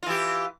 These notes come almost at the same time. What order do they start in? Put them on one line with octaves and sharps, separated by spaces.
F4 E3 G4